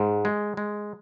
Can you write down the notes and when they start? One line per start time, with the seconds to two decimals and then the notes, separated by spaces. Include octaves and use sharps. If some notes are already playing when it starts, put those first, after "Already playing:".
Already playing: G#2
0.25 G#3
0.57 G#3